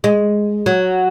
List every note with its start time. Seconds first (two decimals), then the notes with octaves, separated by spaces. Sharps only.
0.04 G#3
0.66 F#3